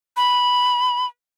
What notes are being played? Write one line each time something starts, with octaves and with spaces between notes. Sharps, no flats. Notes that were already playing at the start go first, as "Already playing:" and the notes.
B5